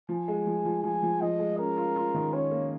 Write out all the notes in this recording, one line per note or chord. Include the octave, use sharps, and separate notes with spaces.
F3 G#5
G#3
F3
F3
F3 G#5
F3
F3 D#5
G#3
C#4 A#4
F4
F4
D#3
C#4 C#5
A#3